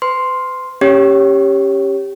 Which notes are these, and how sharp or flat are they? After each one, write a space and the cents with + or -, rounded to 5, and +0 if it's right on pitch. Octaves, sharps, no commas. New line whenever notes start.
B4 +40 C6 +0
C#4 -10 G4 +5 C#5 +0